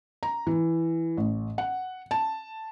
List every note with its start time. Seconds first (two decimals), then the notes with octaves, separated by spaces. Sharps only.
0.23 A#5
0.47 E3
1.17 A1
1.58 F#5
2.11 A5